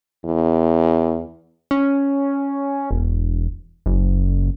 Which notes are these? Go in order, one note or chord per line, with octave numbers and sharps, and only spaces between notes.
E2
C#4
E1
F#1